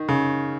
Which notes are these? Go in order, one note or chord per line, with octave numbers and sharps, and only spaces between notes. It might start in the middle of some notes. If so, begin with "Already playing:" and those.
Already playing: D#3
C#3